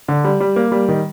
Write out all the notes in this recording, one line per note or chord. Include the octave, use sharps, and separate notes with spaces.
D3
G3
G3
A#3
G3
D#3